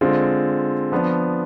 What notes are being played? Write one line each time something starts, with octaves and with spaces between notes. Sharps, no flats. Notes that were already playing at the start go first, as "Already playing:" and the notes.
D3 G#3 C4 F4
F3 B3 D4